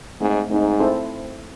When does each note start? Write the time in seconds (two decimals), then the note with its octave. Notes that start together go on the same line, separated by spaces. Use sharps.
0.20 G#2 A3 C4 D#4
0.50 G#2 A3 C4 D#4
0.80 C4 E4 A4 C5